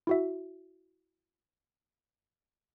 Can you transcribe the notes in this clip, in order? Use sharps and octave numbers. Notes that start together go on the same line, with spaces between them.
E4 F#4 E5